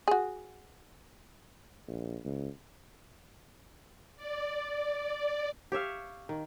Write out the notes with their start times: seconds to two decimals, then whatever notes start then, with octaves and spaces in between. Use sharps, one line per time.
0.08 F#4 G#4
1.88 A#1
2.24 C#2
4.16 D5
5.72 G4 C#5 E5 F5
6.29 D#3